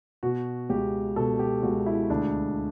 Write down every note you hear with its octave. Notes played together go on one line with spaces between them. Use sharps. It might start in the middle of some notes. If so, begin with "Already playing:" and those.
B2 F#4
C#2 G4
B2 A4
G4
C#2 F#4
E4
D2 D4